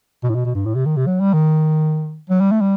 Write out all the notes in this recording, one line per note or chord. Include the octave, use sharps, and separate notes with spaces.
B2
A2
B2
B2
G2
A2
C3
D#3
C3
F#3
G3
D#3
F#3
G3
A3
G3